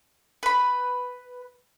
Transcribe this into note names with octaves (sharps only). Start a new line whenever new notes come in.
B4 B5